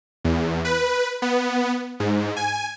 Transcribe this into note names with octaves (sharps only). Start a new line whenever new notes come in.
E2
B4
B3
G#2
G#5